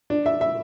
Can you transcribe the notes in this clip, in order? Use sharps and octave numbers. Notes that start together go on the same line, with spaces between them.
D4
E5
E5